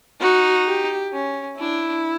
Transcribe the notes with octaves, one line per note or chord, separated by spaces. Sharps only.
D#4 F#4
G4
C#4
D4 E4